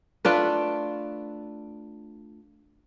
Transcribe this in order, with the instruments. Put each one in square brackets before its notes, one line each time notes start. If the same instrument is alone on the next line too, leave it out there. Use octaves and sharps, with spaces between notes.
[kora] A3 D4 F4 B4